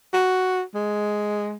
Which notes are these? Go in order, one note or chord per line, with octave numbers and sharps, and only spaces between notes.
F#4
G#3